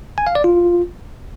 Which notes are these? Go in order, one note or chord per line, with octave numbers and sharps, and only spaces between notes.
G#5
F5
D5
F4